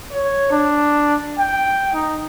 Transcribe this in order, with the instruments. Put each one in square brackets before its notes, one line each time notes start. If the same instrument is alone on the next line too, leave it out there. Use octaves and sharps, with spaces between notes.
[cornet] C#5
D4
G5
D#4